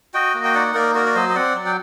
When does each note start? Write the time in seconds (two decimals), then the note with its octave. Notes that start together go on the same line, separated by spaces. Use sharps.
0.14 F#4 D#5 G5
0.34 A#3
0.44 G5
0.55 D#4 D5 F#5
0.74 A#3 A#4 D5
0.94 F#4 A#4 D5
1.06 D5
1.15 F#3 C5 D#5
1.29 D#5
1.35 C4 D5 F#5
1.55 F#3
1.66 G5